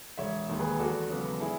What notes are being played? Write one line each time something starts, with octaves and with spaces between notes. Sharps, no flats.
E1 C#5 E5
D#2 D#3
G#4 B4
E2 F#4 A4
C#3 F#3 B3
E4 G#4